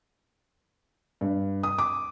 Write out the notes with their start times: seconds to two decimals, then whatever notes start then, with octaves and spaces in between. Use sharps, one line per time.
1.21 G2
1.63 D#6
1.78 D6